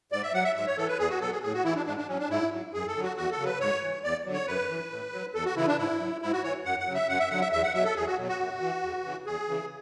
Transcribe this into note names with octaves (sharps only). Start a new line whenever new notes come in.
G#2 D5
E5
F#3 F#5
E5
G#2 E5
C#5
E3 A4
B4
E2 G#4
F#4
B2 F#3 A4
G#4
A2 G#4
F#4
E3 E4
D4
G#2 D4
D4
F#3 C#4
D4
G#2 E4
F#3
F#2 G#4
A4
D3 F#3
F#4
E2 F#4
A4
C#3 F#3
B4
G#2 C#5
E3
E2 D5
D3 F#3
C#5
F#2 B4
E3
A2
F#3
E2 A4
F#4
C#3 E3 E4
D4
G#2 E4
F#3
G#2 E4
F#4
E3 C#5
F#2 F#5
F#5
C#3 F#3
E5
F#2 F#5
E5
D3 F#3 F#5
E5
E2 E5
F#5
B2 F#3 E5
A4
E2 G#4
F#4
B2 F#3
F#4
F#2
E3
E2
C#3 E3
E2 G#4
C#3 E3